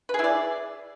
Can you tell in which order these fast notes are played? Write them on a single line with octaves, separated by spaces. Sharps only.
B4 G#4 E4 D5